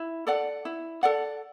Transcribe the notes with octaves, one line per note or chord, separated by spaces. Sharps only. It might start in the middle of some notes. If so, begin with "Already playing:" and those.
Already playing: E4
A4 D5 F#5
E4
A4 D5 F#5